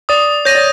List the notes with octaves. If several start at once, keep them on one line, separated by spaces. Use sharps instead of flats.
D5 D#6
C#5 G6 A#6 D#7
D5